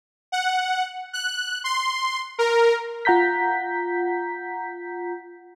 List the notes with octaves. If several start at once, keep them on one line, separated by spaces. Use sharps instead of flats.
F#5
F#6
C6
A#4
F4 F#5 A#5 G6 B6